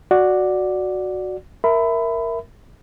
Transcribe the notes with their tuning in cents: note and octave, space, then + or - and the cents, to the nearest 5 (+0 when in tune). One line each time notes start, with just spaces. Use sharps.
F#4 -5 D5 +5
A#4 +0 E5 +0 B5 +25